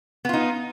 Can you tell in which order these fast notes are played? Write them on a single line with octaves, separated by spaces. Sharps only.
B3 F4 D#4